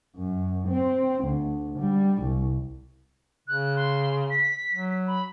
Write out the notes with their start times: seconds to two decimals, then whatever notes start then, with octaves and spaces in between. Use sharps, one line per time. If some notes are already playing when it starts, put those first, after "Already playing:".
0.16 F#2
0.68 C4
1.24 D2
1.79 G3
2.22 C2
3.48 C#3 F#6
3.76 C6
4.30 B6
4.73 F#3
5.07 B5